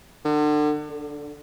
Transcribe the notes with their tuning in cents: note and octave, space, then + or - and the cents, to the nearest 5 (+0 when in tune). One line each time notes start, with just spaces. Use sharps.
D3 +35
D3 -5